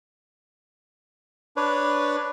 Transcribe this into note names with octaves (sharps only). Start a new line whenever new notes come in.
D4 B4 C#5